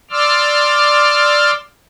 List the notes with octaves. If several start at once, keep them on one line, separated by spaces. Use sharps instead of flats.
D5 C6 D6 E6 F6